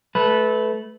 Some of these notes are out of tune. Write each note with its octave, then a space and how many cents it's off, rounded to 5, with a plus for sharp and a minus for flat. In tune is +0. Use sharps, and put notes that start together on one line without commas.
A3 -25 B4 +0